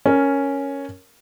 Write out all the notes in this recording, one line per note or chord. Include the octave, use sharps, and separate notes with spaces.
C#4 A#4